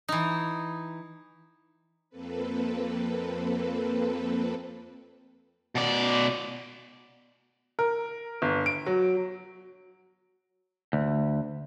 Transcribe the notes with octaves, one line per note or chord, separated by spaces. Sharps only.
E3 D#4
F2 A#3 C4 A4 B4
B2 D5
A#4
G1
D7
F#3
D2